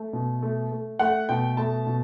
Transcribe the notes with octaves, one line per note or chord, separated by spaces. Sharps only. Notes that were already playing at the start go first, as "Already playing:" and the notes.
Already playing: A3
B2
A3
A3
A3 F#5
B2 G5
A3 A5
B2